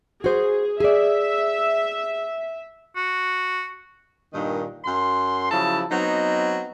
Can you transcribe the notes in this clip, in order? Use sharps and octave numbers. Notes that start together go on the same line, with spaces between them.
F#4 G#4 C5
G#4 D5 E5
F#4
G2 A#2 D#3
F#2 C6
C#3 F3 F#3 E4 A5
F#3 B3 C4 D#4